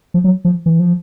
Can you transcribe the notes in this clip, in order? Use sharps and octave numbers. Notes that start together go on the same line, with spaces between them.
F3
F#3
F3
E3
F3